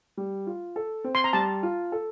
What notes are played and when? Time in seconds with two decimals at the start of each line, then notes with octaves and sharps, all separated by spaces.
0.17 G3
0.47 F4
0.76 A4
1.04 C4
1.15 C6
1.24 A#5
1.33 G3 A5
1.63 F4
1.92 A4